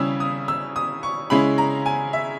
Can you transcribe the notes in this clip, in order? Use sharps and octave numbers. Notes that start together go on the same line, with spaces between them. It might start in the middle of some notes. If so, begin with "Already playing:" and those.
Already playing: C#3 G3 C#4 E4 E6
D#6
E6
D#6
C#6
C#3 G#3 C#4 E4 B5
A#5
G#5
E5